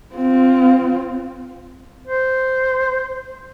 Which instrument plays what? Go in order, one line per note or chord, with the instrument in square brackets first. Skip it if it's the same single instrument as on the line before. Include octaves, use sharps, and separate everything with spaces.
[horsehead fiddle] C4 F4
[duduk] C5